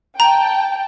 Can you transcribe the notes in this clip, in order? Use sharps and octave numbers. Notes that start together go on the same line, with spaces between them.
G5 A5 A#5